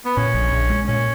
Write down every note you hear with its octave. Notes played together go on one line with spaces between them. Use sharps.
B3
A#2 C#4
A#1
A#1
G#3
A#2 C#4